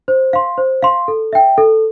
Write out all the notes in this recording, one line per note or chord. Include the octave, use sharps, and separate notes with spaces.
C5
F5 C6
C5
F5 C6
A4
E5 G5
A4